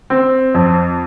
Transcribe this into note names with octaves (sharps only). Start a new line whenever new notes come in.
C4
F2